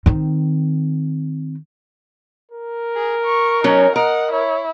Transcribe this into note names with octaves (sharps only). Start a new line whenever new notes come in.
D#3 C4
A#4
G#4
C#6
F#3 C#4 D#4
A#4 D#5 F#5
E4 C#5